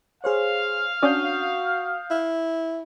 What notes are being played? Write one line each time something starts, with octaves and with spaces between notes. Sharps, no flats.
G#4 C5 C#5 F5
C#4 D4 F#4 D#6 G6
E4